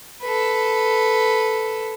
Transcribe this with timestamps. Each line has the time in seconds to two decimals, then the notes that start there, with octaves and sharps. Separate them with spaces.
0.23 A4 B4